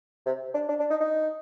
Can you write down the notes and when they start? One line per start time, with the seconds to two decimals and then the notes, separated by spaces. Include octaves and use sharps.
0.26 C3
0.54 D4
0.69 D4
0.79 D4
0.90 D#4
1.00 D#4